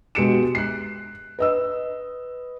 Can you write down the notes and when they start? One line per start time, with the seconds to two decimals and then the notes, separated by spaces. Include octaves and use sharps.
0.15 B2 G#3 G4 C#7 D7 E7
0.55 F#6 C7
1.39 B4 D#5 E6